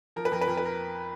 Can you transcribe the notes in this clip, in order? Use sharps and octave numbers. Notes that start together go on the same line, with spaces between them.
F3 A#4
B4
F2 A#4
B4
F2 A#4
B4
A#4